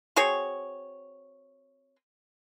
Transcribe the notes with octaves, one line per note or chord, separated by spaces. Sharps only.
C4 F#4 G#4 C#5